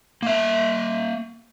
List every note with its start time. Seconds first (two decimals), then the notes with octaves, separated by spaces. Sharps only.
0.22 A#3 E5